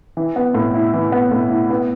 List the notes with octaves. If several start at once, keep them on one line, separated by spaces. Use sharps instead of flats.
E3
B3
A2
E4
E3
B3
A2
E4
B3